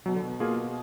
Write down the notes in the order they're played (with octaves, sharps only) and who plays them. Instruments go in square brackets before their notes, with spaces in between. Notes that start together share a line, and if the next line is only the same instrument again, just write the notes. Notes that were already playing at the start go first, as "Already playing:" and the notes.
[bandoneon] B2 [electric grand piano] F#3
[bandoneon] D3
B2
[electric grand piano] A#3 F4 G#4